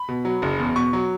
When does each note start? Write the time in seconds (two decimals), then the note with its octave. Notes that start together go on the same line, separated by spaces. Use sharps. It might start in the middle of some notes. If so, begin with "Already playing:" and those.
Already playing: B5
0.09 B2
0.25 F#3
0.42 F#1
0.59 E2
0.76 B2 C#6
0.93 F#3